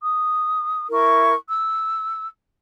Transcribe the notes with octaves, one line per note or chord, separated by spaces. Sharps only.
D#6
E4 A#4 C#6
E6